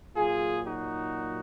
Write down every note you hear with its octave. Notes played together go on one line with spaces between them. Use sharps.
A#2 F#3 F4 G#4
D#4 F#4